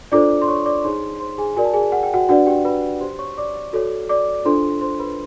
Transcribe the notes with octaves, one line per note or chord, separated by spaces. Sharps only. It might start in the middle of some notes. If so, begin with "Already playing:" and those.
D4 F4 A4 C5 D5 D6
C6
C#5 C#6
D5 D6
D#4 G#4 C5 C#5 C6
C5 C6
G#4 G#5
F#4 A#4 D5 G#5
A5
G#4 G#5
F#5
G5
F#4 F#5
D4 F#4 B4 D5 F#5
G4 G5
B4 B5
G4 C5 C6
C#5 C#6
D5 D6
F#4 A4 C#5
D5 D6
D4 F4 A4 C5 C6
C5 C6
B4 B5